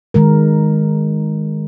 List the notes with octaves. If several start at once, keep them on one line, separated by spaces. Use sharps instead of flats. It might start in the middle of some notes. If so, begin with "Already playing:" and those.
D#3 G#3 A#4